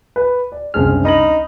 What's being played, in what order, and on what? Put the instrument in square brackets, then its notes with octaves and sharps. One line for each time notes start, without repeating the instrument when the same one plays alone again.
[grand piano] B4
D5
[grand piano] F#1 C4 G#4 [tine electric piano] C2 D4 F6
[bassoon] D#4 [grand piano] B5 A#6 F#7